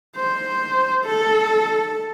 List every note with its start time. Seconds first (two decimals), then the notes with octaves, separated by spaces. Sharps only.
0.16 C5
1.06 A4